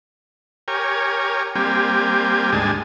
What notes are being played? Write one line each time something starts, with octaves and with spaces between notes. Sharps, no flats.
G4 A#4 C#5 G#5
G3 A#3 C4 G4 G#5
D2 G#2 G3 G#3 G#5 A5